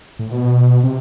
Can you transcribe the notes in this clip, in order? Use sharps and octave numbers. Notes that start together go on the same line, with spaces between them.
A2
B2
C3